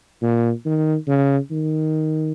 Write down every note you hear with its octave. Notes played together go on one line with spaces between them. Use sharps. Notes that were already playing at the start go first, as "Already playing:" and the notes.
A#2
D#3
C#3
D#3